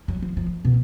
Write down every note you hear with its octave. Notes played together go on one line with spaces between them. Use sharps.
F#3
F3
F3
B2